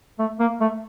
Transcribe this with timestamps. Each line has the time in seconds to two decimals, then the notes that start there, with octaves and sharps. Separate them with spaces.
0.19 A3
0.40 A#3
0.61 A3